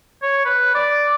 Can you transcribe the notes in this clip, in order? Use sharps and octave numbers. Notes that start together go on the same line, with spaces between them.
C#5
B4
D5